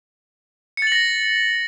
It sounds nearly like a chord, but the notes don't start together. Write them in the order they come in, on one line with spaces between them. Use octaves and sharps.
C#7 A6 F#7 A#6